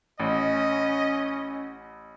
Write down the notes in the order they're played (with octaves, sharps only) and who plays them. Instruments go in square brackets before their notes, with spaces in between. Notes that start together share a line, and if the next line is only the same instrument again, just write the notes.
[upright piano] A1 [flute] C#4 [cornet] D#5